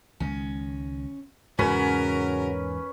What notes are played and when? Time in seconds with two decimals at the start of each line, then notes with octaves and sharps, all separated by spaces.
0.20 C#2 D#3 G#3 C#4
1.59 E2 G#2 C#3 C#4 F#4 A#4 B4